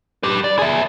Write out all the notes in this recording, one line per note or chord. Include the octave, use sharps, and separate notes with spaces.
G4 B4
D5
G#4 E5